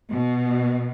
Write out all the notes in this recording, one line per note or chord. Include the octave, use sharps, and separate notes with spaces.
B2